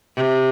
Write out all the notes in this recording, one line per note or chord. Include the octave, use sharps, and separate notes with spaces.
C3